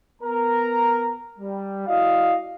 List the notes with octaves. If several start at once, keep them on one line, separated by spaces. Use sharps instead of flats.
B3 A#4 A#5
G3
E4 F#4 D5 D#5 F5